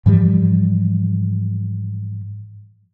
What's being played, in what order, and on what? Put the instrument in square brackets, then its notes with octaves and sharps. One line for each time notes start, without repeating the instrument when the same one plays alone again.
[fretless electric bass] G#2 E3 F3 G3